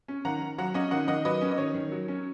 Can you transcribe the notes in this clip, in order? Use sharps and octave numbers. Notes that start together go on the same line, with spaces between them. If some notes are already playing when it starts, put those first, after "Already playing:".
C#4
D#3 F#5 A#5
D#3
F#3 F#5 A#5
C#4 D#5 F#5
D#3 D#5 F#5
D#3 D#5 F#5
F#3 B4 D#5
C#4
D#5
D#3 C#5
D#3
F#3
C#4